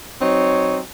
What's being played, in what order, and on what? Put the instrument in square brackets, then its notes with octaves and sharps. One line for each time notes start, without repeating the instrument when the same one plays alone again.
[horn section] F#3 C4 D#4 C#5